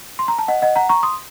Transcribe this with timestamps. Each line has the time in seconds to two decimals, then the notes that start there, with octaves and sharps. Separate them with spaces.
0.19 C6
0.28 A#5
0.38 A5
0.48 D#5 F#5
0.62 D#5 F#5
0.76 F#5 A#5
0.89 A#5 C#6
1.03 C6 D#6